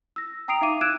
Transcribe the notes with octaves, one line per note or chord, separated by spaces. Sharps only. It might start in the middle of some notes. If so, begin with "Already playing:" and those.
E6 A#6
G5 A#5 D#6 C7 D7 F7
D#4 E5 F5 D6 D#7
E6 F#6 G#6 D7 E7